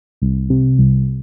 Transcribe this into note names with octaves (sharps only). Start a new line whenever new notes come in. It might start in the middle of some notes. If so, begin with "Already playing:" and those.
C2
C3
C2